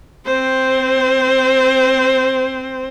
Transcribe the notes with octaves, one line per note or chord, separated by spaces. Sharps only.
C4 C5